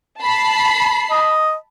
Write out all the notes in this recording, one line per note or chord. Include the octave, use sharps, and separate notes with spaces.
A5 B5 C7
D#5